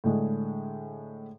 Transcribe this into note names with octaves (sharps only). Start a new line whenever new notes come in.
A2 D3 G#3 G#4